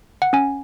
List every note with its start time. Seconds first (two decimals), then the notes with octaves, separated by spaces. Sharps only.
0.22 F#5
0.33 C#4 G#5